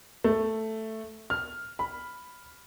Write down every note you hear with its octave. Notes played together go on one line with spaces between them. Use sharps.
A3
F6
B5